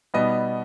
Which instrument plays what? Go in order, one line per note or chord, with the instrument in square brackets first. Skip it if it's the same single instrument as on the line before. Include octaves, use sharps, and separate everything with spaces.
[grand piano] B2 G3 B3 D#4 D#5